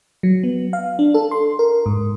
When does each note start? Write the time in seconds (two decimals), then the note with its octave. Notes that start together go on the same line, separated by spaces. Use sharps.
0.23 F#3
0.43 B3
0.73 F5
0.99 D4
1.14 A4
1.31 C6
1.59 A#4
1.86 G#2